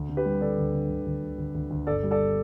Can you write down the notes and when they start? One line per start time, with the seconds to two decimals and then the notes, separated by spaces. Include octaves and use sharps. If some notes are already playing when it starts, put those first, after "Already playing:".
Already playing: D2
0.09 D3
0.17 G4 B4
0.25 G3
0.41 D3 A4 D5
0.58 D2
0.74 D3
0.89 D2
1.06 D2
1.22 D2
1.38 D2
1.54 D2
1.70 D2
1.87 G1 A4 D5
2.03 G3
2.11 A4 D5